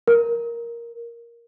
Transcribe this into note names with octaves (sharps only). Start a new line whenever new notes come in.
A#4